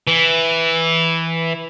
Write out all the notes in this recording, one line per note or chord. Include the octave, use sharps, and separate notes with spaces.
E3